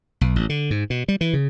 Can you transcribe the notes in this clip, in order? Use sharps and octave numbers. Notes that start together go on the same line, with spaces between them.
B1
A1
D3
G#2
B2
G3
E3
C#3